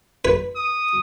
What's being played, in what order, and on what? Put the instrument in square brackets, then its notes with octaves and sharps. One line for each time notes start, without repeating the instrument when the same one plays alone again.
[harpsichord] B4
[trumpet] D#6